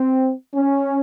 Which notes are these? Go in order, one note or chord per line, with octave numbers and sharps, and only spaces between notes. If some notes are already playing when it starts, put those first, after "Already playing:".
Already playing: C4
C#4